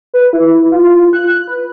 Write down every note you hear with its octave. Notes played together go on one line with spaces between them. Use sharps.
B4
E4
F4
F#6
B4